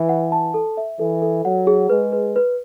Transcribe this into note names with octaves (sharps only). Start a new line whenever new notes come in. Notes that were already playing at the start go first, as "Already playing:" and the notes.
Already playing: E3 B4
F#5
A5
A4
E5
E3 A4
A4
F#3 F#5
G#4
G#3 B4
B4
B4